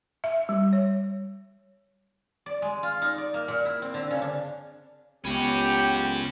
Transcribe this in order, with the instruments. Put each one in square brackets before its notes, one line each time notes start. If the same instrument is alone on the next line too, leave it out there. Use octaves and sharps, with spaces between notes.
[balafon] E5
G3
C#5
[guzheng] D5
G#3
F4
D#4
D5
A#3
A#2
E4
C4
D3
C#3
D4
[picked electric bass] C#2 [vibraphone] B3 [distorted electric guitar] C#4 F#4 [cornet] G4